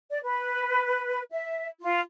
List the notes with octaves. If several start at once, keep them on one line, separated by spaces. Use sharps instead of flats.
D5
B4
E5
F4